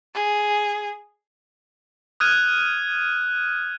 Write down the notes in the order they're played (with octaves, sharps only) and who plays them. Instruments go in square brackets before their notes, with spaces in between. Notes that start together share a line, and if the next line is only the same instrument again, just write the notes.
[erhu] G#4
[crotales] D#6 F6 F#6 G#6 D#7